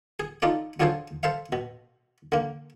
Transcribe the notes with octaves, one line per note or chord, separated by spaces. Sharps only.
G#4
D#4 F4 A4 D5
F#3 D4 F4 G#4 A4 C5
A4 C5 E5 F5
B2
D3 A#3